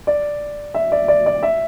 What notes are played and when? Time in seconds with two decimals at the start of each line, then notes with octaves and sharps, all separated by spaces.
0.07 D5
0.74 E5
0.92 D5
1.08 D5
1.26 D5
1.43 E5